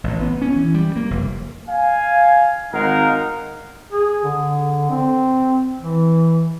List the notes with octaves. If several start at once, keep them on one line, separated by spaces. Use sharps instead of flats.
A1
B3
C#4
E3
G3
A#3
F1
F5 G#5
G#1 G#3 D#4 A#4 F5 F#5
G#4
D3
C4
E3